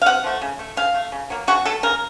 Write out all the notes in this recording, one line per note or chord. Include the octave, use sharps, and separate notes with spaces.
F5
C3 F#5
F3 A3
C#3
A3
C#3 F5
A3
C#3
F#3 A#3
C#3 F#4
F#3 A3 A4
C#3 A#4